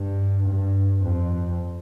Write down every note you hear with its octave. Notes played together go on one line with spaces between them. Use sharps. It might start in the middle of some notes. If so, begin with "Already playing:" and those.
Already playing: G2
G2
F2